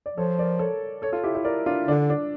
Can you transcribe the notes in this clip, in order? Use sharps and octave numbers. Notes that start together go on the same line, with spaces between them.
D5
F3 A4 C#5
A#4 D5
A4 C#5
A4 C#5
F4 A4
E4 G4
E4 G4
A#4 D5
D4 F4
D3 D4
D4